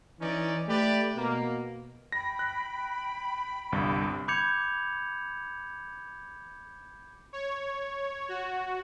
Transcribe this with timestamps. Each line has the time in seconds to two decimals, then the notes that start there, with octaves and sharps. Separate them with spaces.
0.21 E3 C#4 D#4 D5
0.68 A3 G4 B4 D5
1.17 B2 A#3
2.12 G5 B5 A#6
2.39 F#6
3.72 G1 C2 G2
4.28 B5 D6 G6 G#6 C#7 F7
7.33 C#5
8.29 F#4